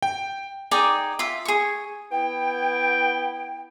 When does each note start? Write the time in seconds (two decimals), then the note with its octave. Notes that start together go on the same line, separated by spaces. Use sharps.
0.02 G5
0.71 D#4 G#4 D5 G5
1.19 F4 E5
1.45 G#4 C#6
2.12 B3 E4 G5